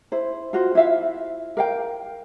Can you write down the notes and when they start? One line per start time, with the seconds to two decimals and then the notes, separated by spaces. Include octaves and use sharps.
0.12 E4 C5
0.53 F4 F#4 C5
0.75 E4 F4 E5 F5
1.57 A#4 F5 G5